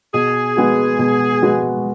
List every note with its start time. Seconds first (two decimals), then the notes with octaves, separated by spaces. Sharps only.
0.14 B2 G#4
0.57 G#3 B3 F#4
0.99 B2
1.42 G#3 B3 F#4